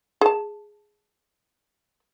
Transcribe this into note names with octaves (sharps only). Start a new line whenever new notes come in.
G#4 A5